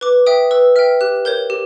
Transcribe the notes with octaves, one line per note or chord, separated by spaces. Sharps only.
B4 D6
E5 G5 D#6
B4 E6
E5 G5 F6
G4 F#6
A#4 C#5 G6
G4